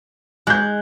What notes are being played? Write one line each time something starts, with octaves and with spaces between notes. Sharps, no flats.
G#3 F#6 G6